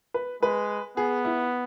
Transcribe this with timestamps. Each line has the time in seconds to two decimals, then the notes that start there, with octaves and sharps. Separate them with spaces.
0.14 B4
0.42 G#3 B4
0.97 B3 G#4
1.25 E4